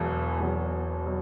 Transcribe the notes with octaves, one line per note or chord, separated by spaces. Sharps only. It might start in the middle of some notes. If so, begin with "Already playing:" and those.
Already playing: E1 E2 B2 F#3
E1 E2 B2 F#3
B2 F#3